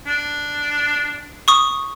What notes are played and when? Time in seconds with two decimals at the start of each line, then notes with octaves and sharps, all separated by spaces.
0.07 D4
1.48 C#6 D#6